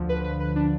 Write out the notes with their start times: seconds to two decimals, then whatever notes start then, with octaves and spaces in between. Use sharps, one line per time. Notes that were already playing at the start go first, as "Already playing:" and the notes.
Already playing: D2 D3 F3
0.09 B4
0.24 B4
0.40 B4
0.56 D4